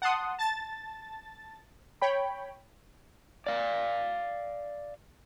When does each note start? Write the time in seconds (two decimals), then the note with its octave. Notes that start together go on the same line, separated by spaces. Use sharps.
0.02 F#5 A5 C6 D#6
0.39 A5 A6
2.02 C#5 G5 B5
3.47 D5 F5